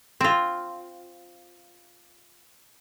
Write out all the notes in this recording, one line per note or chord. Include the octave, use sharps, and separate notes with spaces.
C4 F4